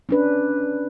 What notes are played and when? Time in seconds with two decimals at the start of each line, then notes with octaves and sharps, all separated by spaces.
0.09 C#4 D4 B4